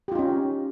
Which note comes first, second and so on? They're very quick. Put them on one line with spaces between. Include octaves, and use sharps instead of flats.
G4 F4 D#4 C#4